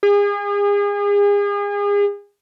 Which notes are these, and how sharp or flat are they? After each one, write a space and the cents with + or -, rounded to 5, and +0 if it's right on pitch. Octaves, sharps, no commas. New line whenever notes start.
G#4 -35